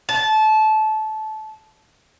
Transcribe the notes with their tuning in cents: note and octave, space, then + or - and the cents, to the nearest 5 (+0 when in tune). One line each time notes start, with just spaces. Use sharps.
A5 -20